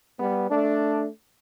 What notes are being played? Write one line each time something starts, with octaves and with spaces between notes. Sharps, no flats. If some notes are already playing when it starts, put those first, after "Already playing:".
G3 B3
A3 D4